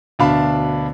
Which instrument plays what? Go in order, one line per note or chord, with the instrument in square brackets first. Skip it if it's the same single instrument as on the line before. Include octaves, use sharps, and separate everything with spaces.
[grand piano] D2 B2 D4 F5 A5 B5